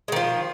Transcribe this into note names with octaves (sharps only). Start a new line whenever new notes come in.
D#3 F3 G#3